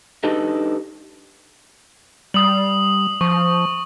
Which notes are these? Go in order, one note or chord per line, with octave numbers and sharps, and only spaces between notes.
D4 D#4 G4 A4 B4 D#5
G3 D#6 F#7
F3 C#6